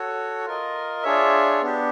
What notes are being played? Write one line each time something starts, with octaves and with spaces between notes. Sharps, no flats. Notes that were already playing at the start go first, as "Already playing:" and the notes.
Already playing: F#4 A4 C#5
F4 A#4 D#5
D4 F4 G#4 C#5 E5
B3 D4 G4